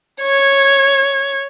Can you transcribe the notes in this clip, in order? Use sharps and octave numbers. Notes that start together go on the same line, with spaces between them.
C#5 G#6